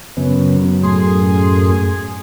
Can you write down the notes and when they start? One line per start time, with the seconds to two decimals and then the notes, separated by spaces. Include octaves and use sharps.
0.17 F#2 C#3 B3 C#4
0.83 A2 A3 G#4 C6